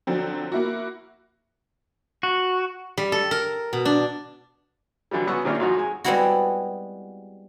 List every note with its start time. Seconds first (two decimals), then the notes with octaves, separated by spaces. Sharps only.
0.07 D3 F3 F#3 C4
0.52 A#3 E4 F#4
2.23 F#4
2.97 G3
3.12 A4
3.31 A#4
3.73 B2
3.85 D4
5.11 D3 E3 F#3 G3
5.27 C#2 F#3 B3 F#5 C#6 E6
5.45 C3 D#3 A#3 C#4 D4 F4
5.59 G#1 F2 F#3 D#4 F#4
5.77 G#3 G#5
6.04 G3 G#3 B3 C4 E4 F#4